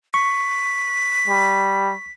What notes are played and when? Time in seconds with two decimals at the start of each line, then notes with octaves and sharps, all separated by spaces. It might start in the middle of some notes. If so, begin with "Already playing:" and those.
0.14 C#6 B6
1.28 G3